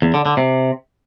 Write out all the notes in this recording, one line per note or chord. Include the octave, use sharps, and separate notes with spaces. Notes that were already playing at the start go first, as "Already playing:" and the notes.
E2
D3
D3
C3